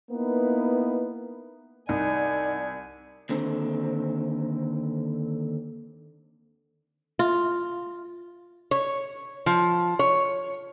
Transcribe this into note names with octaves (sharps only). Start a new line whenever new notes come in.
A#3 B3 D#4 E4 B4
C2 D#4 D5 G#5
D#2 D3 C4
F4
C#5
F3
C#5